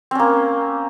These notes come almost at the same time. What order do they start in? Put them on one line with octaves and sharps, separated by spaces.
C4 C#4 A#3